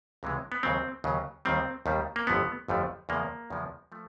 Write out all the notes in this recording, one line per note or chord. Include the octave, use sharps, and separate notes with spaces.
C#2 C3 E3 G#3
B3
D#2 C#3 F#3 C4
D#2 C#3 F#3
D#2 D#3 G3 C4
D#2 D#3 G3
A#3
G1 F2 D3 F3 A3 B3
G1 F2 D3 F3 A3
E2 C#3 F3 G#3 A#3
E2 C#3 F3 G#3
F3 A3